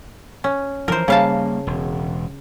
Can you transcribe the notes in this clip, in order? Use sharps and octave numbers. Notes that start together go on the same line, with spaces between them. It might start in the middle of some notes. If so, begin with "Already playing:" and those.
C#4
E3 F3 A#4 C5
C#3 G3 A#3 F5 A5
E1